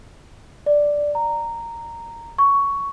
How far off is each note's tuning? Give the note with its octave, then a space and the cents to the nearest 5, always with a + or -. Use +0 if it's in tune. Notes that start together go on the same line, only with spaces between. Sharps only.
D5 +0
A#5 -10
C#6 +10